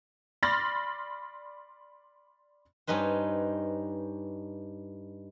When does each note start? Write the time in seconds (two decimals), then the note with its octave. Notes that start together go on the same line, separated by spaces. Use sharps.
0.43 D5 B5 C6 F6 A6 A#6
2.87 G2 C#4 D#4 B4 C5